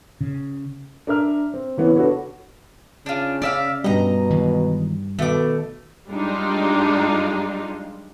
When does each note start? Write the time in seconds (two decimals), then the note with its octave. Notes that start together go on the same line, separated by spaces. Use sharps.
0.21 C#3
1.07 D4 A#4 E5 F6
1.54 C4
1.77 C#3 E3 B3 C#4
1.96 D4 F#4 A4 B4 C#5
3.06 C#3 D4 F4
3.42 C#4 D5 E5 F5
3.84 G2 B2 G3 D#5 A#5
4.30 D#3 E3 G#3
5.19 B2 D#3 A3 D6
6.09 F#2 G3 G#3 D4 D#4 F4